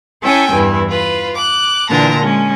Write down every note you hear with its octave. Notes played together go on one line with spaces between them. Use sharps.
C#4 E4 A4 E5 G5 G#5
E2 G2 E3 E4
F4 B4
D6 F#6
A#2 D3 E3 D4 A5 A#5
G#3 C#4